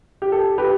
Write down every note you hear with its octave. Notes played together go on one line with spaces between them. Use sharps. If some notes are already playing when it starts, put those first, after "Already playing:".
G4
A4
G4 B4